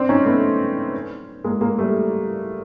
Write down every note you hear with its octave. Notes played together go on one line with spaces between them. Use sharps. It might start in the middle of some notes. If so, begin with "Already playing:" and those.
Already playing: C4 D4
C#4 D#4
A3 B3
G#3 A#3
G#3 A#3
G3 A3